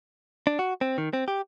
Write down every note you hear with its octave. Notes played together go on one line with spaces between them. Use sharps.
D4
F#4
C4
D#3
C4
G4